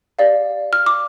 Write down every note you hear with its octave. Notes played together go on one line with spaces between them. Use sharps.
G4 D5 F5
F6
D6